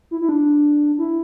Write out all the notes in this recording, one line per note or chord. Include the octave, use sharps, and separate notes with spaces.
E4
E4
D4
E4